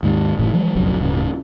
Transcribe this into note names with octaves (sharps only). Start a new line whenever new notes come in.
D#2 G#2 D3 D#3
F#1 A2 E3
E3 F3 G3 G#3
F#1 B1 F2 F#3
D1 G2 C#3